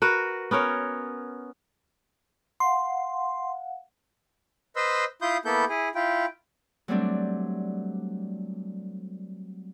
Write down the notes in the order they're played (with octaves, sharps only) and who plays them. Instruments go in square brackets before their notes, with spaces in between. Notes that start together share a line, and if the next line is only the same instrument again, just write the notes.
[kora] F#4 A#4 B4
B3 C#4 A#4 C#5
[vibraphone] F5 F#5 [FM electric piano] C6
[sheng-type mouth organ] B4 C5 D#5 C6 E6
E4 F4 C6 D#6 G6
A#3 B3 E4 A4 G6
E4 G#4
E4 F4 G5
[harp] F#3 G3 A3 C4 D4